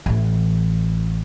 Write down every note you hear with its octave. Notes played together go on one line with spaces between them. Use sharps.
A1 E3